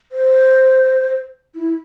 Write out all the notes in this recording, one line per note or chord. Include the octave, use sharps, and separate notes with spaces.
C5
E4